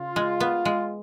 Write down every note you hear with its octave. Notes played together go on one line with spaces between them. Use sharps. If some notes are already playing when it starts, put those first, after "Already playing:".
Already playing: C#3 F4
G#3
B3
G#3